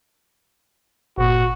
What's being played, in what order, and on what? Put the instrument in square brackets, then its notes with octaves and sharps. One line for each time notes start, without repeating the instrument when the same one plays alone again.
[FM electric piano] G1 A#2 [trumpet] F#4